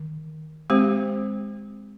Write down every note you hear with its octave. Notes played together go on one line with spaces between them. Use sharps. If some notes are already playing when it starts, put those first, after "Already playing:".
Already playing: D#3
G#3 C4 G4 C5